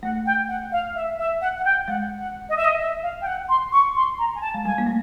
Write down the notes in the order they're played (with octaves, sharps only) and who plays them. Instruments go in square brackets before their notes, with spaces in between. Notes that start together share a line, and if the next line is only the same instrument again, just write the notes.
[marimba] A3 [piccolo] F#5
[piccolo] G5
F#5
F5
E5
E5
F#5
F#5
G5
[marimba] G#3 [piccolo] F#5
[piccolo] F#5
D#5
E5
D#5
E5
F5
G5
F#5
C6
C#6
C6
A#5
G#5
A5
[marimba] G#3
[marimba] G3 [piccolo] G#5
[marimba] A#3
A3